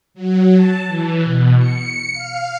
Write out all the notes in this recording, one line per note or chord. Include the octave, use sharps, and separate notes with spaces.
F#3
A5
E3
B2
C#7
F5